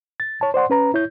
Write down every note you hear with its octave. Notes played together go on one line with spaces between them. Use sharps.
A6
C#5 A5
C5 D5 F#5 C6
C#4 B4 A#5
E4 C#5 G6